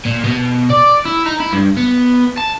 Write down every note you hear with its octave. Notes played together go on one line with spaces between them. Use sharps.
A#2
B2
D5
E4
D#4
E4
G2
B3
A5